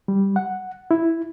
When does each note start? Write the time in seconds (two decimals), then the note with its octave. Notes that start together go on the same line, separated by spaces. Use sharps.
0.08 G3
0.36 F#5
0.91 E4